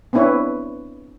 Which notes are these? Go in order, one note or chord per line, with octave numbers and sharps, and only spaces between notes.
B3 C4 D4 E4 B4 C#5